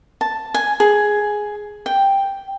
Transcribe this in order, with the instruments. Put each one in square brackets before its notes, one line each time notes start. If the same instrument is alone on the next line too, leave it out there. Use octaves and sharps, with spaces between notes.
[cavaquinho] A5
G#5
G#4
G5